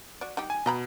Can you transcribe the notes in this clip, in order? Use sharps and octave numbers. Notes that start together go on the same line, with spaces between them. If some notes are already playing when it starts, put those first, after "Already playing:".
F#4 D5
G3 D#4 G4
G#5
B2 D#5 A#5 B5